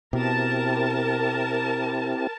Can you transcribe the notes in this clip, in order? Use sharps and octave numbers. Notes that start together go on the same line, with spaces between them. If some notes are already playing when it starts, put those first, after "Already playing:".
B2 C4 E4 G4 A#4 A5